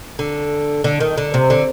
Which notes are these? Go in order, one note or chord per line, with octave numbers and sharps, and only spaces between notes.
D3
D3
D#3
D3
C3
D3